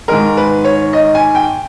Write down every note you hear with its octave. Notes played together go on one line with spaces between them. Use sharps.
G#2 D#3 G#3 A#4
B4
C#5
D#5
G#5
G5